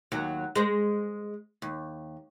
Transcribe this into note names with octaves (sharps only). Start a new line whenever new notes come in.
D#2 F#3
G#3 C5
D#2